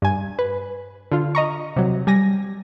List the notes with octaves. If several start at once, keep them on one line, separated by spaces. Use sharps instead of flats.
G2 G#5
B4
D3 F4
D#5 A#5 C#6
C3 F#3
G3 G#5 A#6